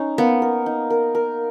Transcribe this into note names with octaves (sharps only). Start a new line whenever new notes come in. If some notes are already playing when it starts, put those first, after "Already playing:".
Already playing: C#4 D#4
A#3 B3
A#4
D#4
A#4
A#4